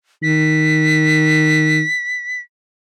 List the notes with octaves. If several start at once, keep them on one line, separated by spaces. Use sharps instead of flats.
D#3 B6